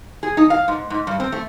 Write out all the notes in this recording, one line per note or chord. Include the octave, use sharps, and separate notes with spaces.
G#4
D#4
F5
G#2
G#2
G2
C4
A3